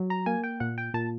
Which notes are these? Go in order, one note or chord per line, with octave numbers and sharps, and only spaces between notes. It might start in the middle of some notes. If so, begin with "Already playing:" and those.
Already playing: F#3
A#5
A#3 G#5
G5
A#2 F#5
G5
A#2 A5